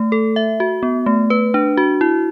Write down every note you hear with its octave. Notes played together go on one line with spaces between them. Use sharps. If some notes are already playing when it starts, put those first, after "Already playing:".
Already playing: A3
A4
E5
F#4
B3
A3
B4
D4
F#4
E4